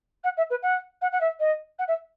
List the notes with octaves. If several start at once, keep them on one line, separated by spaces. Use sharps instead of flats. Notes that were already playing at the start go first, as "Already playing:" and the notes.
F#5
E5
B4
F#5
F#5
F#5
E5
D#5
F#5
E5